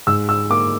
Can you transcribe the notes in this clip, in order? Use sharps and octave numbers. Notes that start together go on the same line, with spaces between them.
G#2 E6
E6
A#3 D6